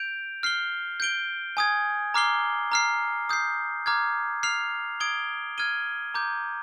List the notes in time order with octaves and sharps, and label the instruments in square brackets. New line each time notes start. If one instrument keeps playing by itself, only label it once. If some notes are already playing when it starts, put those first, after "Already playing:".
Already playing: [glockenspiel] G6 D7 F7
F6 C7 G7
G6 D7 G7
G#5 D#6 G#6
A#5 D6 F6 C7 G7
A#5 F6 C7
D#6 G6 C7
A#5 D6 F6 G#6
F6 C7 F7
D#6 G#6 D7 G7
F6 G#6 D#7 G7
A#5 D6 G6